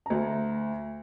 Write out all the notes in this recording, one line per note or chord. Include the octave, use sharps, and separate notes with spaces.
D2 A#5